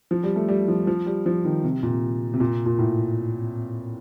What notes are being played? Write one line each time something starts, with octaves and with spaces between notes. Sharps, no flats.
F3
G3
A3
G3
F3
F3
G3
F3
D#3
C3
A#2
C3
A#2
A#2
A2